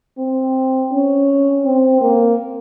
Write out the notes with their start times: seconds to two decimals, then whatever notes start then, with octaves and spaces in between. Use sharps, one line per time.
0.18 C4
0.92 C#4
1.65 C4
2.01 A#3